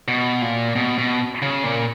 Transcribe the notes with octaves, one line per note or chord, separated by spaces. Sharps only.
B2
A#2
B2
B2
C#3
A#2